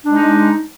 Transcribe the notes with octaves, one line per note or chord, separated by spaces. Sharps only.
G#3 D4 D#4